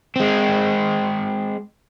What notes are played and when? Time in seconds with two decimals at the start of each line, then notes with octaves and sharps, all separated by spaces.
0.16 G#3 C4